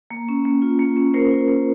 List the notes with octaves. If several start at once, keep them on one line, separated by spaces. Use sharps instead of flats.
A#3
C#4
A#3
F4
A#3
C#4
A#3 A#4 C5
F4
A#3